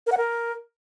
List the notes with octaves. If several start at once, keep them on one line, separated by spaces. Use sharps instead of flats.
A#4
F#5
A#4